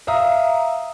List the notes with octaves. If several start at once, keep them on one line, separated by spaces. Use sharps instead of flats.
E5 F5 A#5 D#6